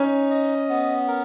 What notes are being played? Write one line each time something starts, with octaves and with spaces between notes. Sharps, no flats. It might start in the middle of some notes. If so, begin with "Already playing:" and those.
Already playing: C#4 D#4
D#5
B3
A#4